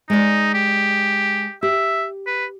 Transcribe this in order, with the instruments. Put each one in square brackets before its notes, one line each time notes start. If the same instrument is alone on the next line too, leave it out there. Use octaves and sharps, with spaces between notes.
[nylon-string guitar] G#3 D5 [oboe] D#4
[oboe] G4
[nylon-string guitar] G4 [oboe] E5
[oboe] B4